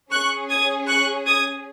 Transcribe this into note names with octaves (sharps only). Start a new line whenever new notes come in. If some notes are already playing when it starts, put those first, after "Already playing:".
C#4 G#4 C#6 F#6
D#6 G#6
C#6 F#6
D#6 G#6